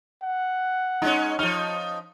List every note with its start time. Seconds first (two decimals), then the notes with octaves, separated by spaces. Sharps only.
0.22 F#5
1.02 G#3 C#4 D#4
1.39 F3 D#4 F6